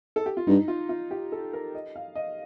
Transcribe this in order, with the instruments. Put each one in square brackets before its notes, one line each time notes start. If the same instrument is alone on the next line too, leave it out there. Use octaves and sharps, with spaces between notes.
[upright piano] A4
G4
F4
[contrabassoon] G2 [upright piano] D#4
[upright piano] F4
F4
G4
A4
A#4
D#5
F5
D#5